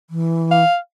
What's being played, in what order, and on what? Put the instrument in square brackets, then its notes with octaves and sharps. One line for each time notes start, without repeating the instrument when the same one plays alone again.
[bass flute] E3
[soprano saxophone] F5